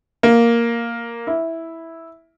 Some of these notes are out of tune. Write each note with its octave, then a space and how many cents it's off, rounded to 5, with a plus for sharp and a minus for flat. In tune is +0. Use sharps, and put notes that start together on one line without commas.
A#3 +0
E4 -5